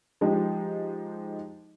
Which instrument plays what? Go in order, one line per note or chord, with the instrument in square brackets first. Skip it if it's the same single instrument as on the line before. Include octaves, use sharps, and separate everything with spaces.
[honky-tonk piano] F3 G#3 D#4 G4